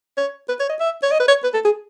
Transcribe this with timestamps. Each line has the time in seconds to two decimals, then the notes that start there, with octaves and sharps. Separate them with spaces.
0.17 C#5
0.49 B4
0.60 C#5
0.69 D#5
0.80 E5
1.03 C#5
1.12 D#5
1.20 B4
1.28 C#5
1.44 B4
1.54 A4
1.65 G#4